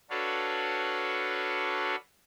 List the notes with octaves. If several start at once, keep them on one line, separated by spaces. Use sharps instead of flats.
D4 F#4 A4 B4 C#5 F5